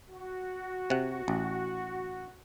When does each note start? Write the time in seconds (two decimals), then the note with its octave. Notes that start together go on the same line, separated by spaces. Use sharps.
0.11 F#4
0.90 C3 F#5
1.28 A1